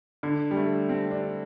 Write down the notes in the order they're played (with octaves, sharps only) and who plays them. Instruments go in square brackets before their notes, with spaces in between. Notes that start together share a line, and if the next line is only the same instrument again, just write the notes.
[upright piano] D3
G3
A3
C4
D4